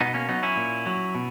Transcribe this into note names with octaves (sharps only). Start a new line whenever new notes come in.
B2 B3 D#4
A#3 C#4
F#3 B3 D#4
C#4 E4
A#2
F#3
B2